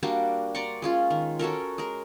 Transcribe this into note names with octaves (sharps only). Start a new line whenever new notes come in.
G3 A#3 D4 F#4
D5 A#5 C6 C#6
G#3 C#4 F4
D#3
C#4 F#4 A4 A#4
G#3 A#4